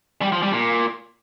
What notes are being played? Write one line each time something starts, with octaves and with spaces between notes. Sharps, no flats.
G3
F3
G3
A#2